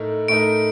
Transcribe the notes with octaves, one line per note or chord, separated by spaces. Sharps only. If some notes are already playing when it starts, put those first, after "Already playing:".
Already playing: A2 A3 D#4 A#4
A2 A3 D#4 A#4 D7